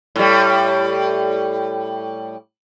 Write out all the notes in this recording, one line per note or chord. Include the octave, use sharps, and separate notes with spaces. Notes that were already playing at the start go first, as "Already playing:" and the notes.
A2 G3